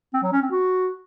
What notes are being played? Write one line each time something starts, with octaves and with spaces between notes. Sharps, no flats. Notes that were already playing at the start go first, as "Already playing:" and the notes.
C4
F#3
C#4
C4
F#4